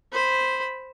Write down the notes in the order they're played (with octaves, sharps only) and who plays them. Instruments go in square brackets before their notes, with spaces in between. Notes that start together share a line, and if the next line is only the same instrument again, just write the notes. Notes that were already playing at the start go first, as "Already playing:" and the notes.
[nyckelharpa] C5 B5